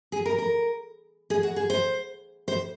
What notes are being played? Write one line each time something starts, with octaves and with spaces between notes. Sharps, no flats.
G#4
A#4
A#4
G#4
F#4
G#4
C5
C5